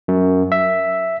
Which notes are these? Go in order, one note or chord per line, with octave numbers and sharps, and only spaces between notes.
F#2
E5